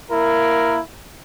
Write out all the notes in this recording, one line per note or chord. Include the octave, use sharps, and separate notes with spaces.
A#3 E4 A#4